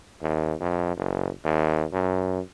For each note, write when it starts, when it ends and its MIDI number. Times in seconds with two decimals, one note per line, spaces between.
0.22 0.54 39
0.60 0.96 41
0.97 1.29 30
1.45 1.85 39
1.93 2.40 42